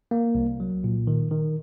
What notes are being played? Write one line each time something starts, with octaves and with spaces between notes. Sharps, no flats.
A#3
C2
F#3
A#2
D#3
D#3